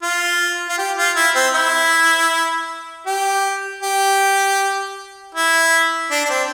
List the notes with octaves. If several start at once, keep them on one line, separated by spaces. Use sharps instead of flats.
F4
F4
G4
F4
E4
C4
E4
G4
G4
E4
D4
D4
C4